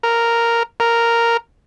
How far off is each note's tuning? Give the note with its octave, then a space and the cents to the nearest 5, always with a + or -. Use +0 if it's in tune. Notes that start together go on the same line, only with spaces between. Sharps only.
A#4 -5
A#4 -5